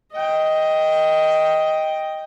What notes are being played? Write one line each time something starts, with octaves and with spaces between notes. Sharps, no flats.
D#5 G5